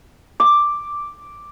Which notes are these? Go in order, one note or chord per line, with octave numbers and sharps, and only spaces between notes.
D6